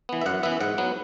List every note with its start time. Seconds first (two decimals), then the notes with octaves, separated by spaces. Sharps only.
0.09 E3 B3
0.21 E5
0.26 F#2 F#5
0.43 E3 B3 E5
0.60 G#2 F#5
0.78 F#3 B3